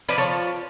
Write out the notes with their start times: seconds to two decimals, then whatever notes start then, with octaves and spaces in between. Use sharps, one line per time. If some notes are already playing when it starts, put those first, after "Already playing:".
0.09 F3 B4 D5
0.18 A4 C#5